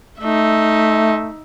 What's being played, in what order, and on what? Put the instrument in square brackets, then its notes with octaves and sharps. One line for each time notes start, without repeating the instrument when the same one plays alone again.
[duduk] A3 [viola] D#4 E5